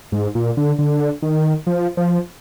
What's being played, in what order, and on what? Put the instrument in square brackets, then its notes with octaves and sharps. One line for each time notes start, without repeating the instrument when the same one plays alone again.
[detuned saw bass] G#2
A#2
D3
D3
D#3
F3
F3